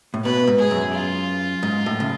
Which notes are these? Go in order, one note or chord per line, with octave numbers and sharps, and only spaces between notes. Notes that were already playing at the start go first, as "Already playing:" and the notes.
A2
B2 B4
G#2
G#4
F#2
F4
G#2
A2
C#3